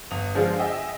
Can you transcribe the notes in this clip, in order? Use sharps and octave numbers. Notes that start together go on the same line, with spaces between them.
G1 D#6 F7
D3 F3 G#3 D4 F4 G#4
D#5 E5 G5 G#5